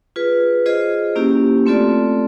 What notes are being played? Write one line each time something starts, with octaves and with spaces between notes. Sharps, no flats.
F4 G#4 B4
F4 G#4 C5 D#5
A#3 C#4 E4 G4
A3 C4 F4 A4 D5